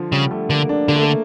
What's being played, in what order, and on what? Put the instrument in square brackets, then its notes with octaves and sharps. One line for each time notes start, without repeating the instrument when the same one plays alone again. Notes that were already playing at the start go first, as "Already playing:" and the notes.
Already playing: [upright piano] D3 F3
[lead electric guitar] C#3 [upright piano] G3
[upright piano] A3
[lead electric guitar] D3 [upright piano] A#3
[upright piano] D4
[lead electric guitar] D3 [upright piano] A#3
[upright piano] A3
A#3